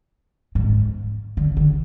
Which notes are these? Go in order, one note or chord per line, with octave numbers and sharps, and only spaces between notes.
G#2
D3
D3